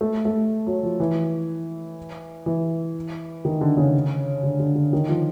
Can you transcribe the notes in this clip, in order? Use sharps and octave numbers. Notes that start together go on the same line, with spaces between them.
A3
A3
F#3
F3
E3
E3
D#3
D3
C#3
D3
D3
D3
D#3
F3